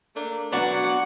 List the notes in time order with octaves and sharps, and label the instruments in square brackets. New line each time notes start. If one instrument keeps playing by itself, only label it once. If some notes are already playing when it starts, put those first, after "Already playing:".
[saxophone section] A3 A#3 D4
[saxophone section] F#3 D5 [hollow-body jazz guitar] B3 D4 F#4 [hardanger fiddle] F#5